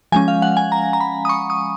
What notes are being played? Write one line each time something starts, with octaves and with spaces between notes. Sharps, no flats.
F3 G#3 C#4 G#5
F5
F#5
G#5
A#5
A#5
B5
D#6
C#6
D#6